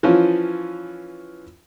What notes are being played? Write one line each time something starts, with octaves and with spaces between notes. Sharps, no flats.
E3 F3 C#4 F4